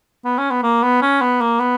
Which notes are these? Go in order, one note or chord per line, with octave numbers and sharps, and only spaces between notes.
B3
C#4
B3
A#3
B3
C#4
B3
A#3
B3